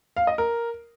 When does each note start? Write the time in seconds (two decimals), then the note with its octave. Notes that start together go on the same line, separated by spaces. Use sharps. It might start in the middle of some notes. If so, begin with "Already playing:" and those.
0.17 F5
0.27 D#5
0.38 A#4